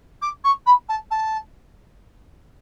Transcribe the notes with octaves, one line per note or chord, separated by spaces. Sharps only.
D6
C#6
B5
A5
A5